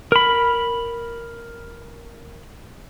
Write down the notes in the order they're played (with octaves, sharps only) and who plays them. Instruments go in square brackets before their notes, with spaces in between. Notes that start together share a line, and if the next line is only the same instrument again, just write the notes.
[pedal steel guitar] A#4 B5